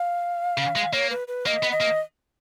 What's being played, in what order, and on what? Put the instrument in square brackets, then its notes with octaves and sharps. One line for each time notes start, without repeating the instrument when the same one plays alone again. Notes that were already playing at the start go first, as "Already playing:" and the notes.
Already playing: [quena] F5
[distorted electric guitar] C#3
G#3
[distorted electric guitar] A#3 [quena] C#5
[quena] B4
B4
[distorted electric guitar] A#3 [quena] D#5
[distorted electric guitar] B3
[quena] D#5
[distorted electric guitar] A#3